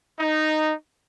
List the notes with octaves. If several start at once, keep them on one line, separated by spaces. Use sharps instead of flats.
D#4